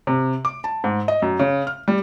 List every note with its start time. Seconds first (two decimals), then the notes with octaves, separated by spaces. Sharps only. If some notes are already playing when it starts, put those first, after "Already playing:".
0.07 C3
0.45 D6
0.64 A5
0.84 G#2
1.08 D#5
1.22 F#2
1.39 C#3
1.67 F6
1.88 G3